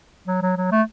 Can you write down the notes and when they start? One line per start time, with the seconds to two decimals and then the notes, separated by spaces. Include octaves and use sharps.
0.27 F#3
0.42 F#3
0.57 F#3
0.72 A3